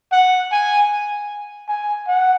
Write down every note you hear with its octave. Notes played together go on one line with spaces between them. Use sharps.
F#5
G#5
G#5
F#5